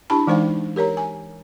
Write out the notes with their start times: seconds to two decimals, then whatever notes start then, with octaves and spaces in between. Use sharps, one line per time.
0.10 D4 E4 G4 A5 B5
0.27 E3 G#3 D#4 C5 F5 G5
0.76 G4 A#4 C#5 A#5
0.97 G#5